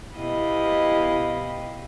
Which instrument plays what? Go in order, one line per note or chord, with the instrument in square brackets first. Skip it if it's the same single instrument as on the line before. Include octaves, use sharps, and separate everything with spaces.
[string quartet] B2 E4 G4 D#5 F5 B5